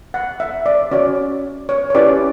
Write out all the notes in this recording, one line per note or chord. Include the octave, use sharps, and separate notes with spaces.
F#5
E5
D5
C#4 F#4 C#5 D5
C#5
C#5
C#4 E4 G4 B4 D5